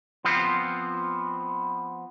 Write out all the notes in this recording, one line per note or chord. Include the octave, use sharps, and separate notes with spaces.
F3 B3 C4 F4